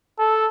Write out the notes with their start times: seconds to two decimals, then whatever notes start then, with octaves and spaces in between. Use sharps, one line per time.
0.19 A4